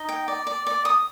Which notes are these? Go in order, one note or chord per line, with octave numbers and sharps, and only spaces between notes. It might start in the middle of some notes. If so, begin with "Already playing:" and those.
Already playing: D#4
G5
D5
D5
D5
D#6